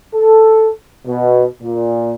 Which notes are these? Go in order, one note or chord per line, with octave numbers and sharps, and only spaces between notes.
A4
B2
A#2